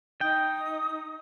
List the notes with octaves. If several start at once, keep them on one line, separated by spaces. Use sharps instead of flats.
D#4 G5 D#6